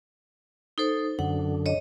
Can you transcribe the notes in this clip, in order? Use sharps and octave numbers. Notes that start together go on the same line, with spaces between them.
D#4 A4 C5
F#2 D3 F#5
C#5 D#5